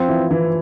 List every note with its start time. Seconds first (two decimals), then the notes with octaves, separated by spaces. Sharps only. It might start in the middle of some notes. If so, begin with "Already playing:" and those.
Already playing: F3 C4 F4
0.08 E3 E4
0.31 E3 E4